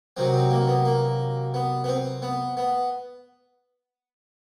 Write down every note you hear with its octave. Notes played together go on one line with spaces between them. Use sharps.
C3 D#3 F#3 C4
C4
A#3
B3
A#3
B3
B3
C4
B3
B3